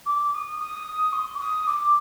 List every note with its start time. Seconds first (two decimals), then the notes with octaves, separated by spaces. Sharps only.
0.05 D6
0.33 D#6
0.59 D#6
1.12 C6
1.35 D6
1.39 D#6
1.66 D6